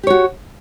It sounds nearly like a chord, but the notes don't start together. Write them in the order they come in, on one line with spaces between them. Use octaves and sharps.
G4 C#5 F#4